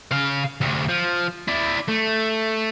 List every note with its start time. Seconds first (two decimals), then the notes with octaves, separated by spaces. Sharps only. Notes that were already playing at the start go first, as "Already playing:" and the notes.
0.12 C#3 F5
0.61 D2 C3
0.89 F3
1.48 E4 D5
1.88 A3